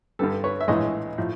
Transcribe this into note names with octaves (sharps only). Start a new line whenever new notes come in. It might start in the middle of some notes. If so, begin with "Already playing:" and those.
G2 D3 G3 A4 B4
B4 C#5
E5
A#1 A2 E3 G#3 C#5 D#5
A2 F3